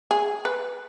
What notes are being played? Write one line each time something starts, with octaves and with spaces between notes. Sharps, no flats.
G#4
B4